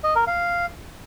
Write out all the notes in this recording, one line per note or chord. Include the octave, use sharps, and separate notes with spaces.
D#5
A#4
F5